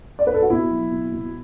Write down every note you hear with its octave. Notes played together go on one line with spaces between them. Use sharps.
D5
B4
A4
F#4
B2 E4
F#3
B2
B2